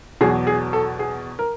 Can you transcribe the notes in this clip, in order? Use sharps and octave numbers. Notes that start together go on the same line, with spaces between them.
E2 B2 F#3 G#4
G#4
A4
G#4
A#4